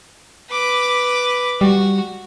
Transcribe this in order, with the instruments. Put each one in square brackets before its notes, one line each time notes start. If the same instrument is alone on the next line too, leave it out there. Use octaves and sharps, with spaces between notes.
[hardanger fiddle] B4 D6
[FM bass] G3 [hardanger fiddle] F#4